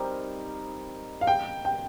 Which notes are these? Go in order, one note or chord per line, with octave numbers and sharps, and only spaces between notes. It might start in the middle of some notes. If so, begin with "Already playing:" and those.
Already playing: G3 C4 D#4 A#4
F5
G5
G5